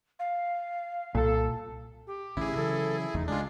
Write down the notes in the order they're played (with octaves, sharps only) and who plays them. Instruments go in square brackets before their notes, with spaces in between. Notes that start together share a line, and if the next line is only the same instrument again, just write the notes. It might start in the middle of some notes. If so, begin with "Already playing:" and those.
[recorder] F5
[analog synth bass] C2 [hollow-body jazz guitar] A#2 [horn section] A4
[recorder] G4
[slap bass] A1 D3 C#4 [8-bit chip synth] E4 G#4
[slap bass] C#3 E3 F#3 [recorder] A4
[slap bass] F1 E2 A3 [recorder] D#4
[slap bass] C#2 [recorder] G#3 [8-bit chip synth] D4 F4